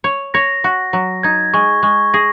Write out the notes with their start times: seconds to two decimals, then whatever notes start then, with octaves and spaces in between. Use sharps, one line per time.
0.04 C#5
0.34 C#5 A#6
0.64 F#4
0.93 F#3
1.23 D#4 G#6
1.54 G#3 C#6
1.83 G#3 C#6
2.14 G#4 A#6